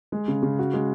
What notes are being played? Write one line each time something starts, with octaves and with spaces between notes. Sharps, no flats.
G#3
C#3
C#3
F#4
G#3